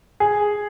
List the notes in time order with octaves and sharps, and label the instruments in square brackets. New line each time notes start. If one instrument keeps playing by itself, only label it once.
[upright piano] G#4